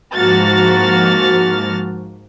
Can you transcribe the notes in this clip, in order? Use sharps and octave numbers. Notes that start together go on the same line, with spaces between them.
G#2 F3 A#3 F#4 F6 A6